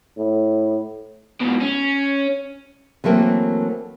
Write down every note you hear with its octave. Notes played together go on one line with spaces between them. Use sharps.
A2
G#2 B2
C#4
E3 F#3 A3 A#3 C4